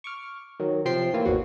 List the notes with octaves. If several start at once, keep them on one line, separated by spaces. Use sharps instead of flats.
C#6 D6 F6
D#3 F#3
C3 F3 G5 C6 C7
A2 E3 A#3 C4 F4
G#1 E2 A#3 F#4